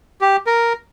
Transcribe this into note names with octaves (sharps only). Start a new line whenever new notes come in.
G4
A#4